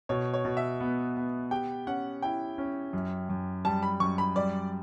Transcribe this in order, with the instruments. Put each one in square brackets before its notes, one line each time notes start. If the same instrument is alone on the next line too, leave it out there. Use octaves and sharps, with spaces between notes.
[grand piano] B2 [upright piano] C#5
[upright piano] C#5
[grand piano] B2
[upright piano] E5
[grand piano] B3
B3
[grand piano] G4 [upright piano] G5
[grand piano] C#4 [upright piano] F#5
[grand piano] E4 [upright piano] G5
[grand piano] C#4
F#2
F#2
[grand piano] G3 [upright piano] A5
[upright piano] B5
[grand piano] F#2 [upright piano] C#6
[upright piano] B5
[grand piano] G3 [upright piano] D5